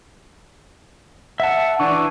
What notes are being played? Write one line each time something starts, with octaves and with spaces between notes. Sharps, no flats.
E5 F#5 A5
E3 D4 C#6